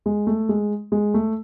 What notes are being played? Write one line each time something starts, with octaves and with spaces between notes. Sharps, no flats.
G#3
A3
G#3
G#3
A3